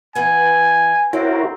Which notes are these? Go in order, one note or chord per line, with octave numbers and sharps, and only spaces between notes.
E3 B3 G#5
C4 C#4 E4 F#4 A#4